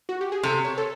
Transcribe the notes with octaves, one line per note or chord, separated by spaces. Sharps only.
F#4
G4
G#4
C3 A4
C#5
A4